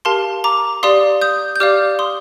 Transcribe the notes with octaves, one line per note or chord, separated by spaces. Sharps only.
G4 A#4 F5 A5 C6
A#5 D6
G4 D5 F5 C6 D#6
D#6 G6
G6
G4 D5 F5 D6 F6
C6 D#6